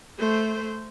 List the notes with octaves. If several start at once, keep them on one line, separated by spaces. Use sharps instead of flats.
A3 C5